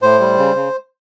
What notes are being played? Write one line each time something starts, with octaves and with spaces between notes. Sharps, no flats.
A2 C5
G3
C#3
C#3